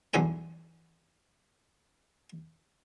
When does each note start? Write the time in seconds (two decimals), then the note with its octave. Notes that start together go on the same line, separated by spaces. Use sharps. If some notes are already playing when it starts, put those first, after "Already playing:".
0.14 B1 E2 G2 A4 G#5 A#5